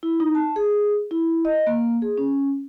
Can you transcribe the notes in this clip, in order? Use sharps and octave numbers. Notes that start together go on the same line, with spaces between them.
E4
D#4
A5
G#4
E4
D#5
A#3
G#4
C#4